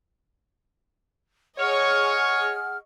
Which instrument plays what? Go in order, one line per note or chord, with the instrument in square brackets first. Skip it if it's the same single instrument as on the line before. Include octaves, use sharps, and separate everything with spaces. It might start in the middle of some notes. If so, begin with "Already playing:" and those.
[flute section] G#4 F#5 F6 [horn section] C#5 [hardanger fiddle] D#5 C#6